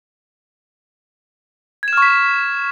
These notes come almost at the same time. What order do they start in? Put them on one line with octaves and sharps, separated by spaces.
G#6 E7 F6 C#6 B6